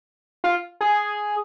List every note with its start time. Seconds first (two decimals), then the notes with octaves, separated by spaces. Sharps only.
0.44 F4
0.81 G#4